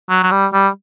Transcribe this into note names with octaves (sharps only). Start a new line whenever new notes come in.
F#3
F#3
G3
G3